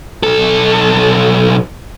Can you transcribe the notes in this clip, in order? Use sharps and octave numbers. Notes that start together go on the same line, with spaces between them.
B1 A4